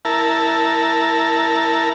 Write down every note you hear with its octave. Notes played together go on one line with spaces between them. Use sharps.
E4 A#4 A5